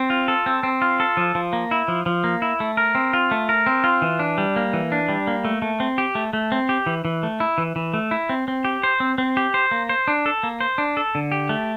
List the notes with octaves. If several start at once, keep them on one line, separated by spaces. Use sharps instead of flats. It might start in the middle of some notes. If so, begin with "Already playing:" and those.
Already playing: C4
F4
A4
C4
C4
F4
A4
F3
F3
A#3
E4
F3
F3
A#3
E4
A3
A#4
C4
F4
A3
A#4
C4
F4
E3
D4
G3
A#3
E3
D4
G3
A#3
A3
A3
C4
G4
A3
A3
C4
G4
E3
E3
A3
E4
E3
E3
A3
E4
C4
C4
G4
C5
C4
C4
G4
C5
A#3
C5
D4
A4
A#3
C5
D4
A4
D3
G4
A3